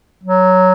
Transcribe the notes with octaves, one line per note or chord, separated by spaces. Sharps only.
F#3